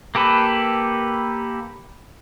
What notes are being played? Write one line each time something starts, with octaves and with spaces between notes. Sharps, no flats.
A#3 G4 A4 B4